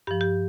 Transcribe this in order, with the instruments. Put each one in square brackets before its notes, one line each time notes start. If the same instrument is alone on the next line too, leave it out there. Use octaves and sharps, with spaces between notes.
[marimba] G2 F3 G4
G4